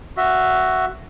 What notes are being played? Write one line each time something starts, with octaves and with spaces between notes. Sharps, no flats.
F#4 E5